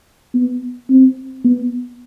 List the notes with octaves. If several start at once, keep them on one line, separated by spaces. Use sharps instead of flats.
B3
C4
B3